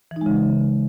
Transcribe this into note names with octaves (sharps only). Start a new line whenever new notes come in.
C#3 E3 G#3 D#4